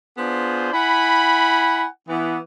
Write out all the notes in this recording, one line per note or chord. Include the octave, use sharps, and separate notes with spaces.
B3 D4 F4 G#4 C5
E4 F#5 G#5 B5
E3 B3